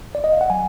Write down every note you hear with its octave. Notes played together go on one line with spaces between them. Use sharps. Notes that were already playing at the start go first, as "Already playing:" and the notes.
D5
D#5
F5
F#5
F#3 G#5